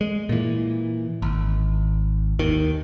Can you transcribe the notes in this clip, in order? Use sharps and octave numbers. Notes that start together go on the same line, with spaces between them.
G#3
A#2 E3
G#1
D#2 D#3